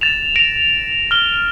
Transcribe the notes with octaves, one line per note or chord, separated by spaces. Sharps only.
A6 E7 F7
A#6 D7 F7
F6 G7